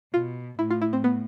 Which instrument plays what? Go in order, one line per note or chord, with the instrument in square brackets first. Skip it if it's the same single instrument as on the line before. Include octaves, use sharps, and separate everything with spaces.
[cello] B2 [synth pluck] F4
[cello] A2 [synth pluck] E4
[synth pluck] F4
E4
C4
B3